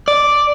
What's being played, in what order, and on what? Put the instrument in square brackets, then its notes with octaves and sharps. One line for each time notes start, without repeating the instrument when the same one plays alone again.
[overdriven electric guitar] D5